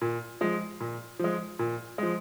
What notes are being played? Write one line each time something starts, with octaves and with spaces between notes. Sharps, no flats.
A#2
F3 G#3
A#2
F3 G#3
A#2
F3 G#3